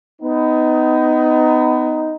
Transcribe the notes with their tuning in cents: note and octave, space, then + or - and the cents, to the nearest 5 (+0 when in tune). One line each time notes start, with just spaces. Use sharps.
B3 +30 D#4 +5